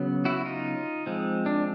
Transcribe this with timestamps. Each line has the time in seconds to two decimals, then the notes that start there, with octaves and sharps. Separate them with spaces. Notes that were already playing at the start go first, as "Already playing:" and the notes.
Already playing: C#3 F#3 B3
0.25 E4 F#4
0.45 D#4 F4
1.06 F3 G#3 C4
1.46 D4